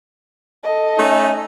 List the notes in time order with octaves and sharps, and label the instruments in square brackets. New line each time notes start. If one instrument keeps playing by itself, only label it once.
[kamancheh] A4 D#5
[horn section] A3 C#4 D#4